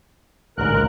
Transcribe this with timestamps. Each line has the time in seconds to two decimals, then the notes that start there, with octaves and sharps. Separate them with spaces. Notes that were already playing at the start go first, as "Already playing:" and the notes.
0.58 A1 D2 G#2 A#4 F#6
0.74 C#2